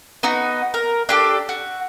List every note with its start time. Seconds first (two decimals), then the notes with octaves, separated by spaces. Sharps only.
0.23 B3 D#4 F#4
0.74 A#4
1.09 D4 G4 A4
1.49 F#4